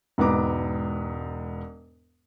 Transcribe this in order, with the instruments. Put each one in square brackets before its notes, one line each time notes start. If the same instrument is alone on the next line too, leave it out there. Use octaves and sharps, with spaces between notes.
[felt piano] E1 G#2 B3 A#5 D6